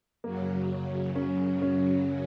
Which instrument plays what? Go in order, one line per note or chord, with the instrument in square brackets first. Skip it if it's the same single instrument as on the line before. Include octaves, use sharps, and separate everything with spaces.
[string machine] F#2 C#3 F#3 [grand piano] A#3
[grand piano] C#4
C#4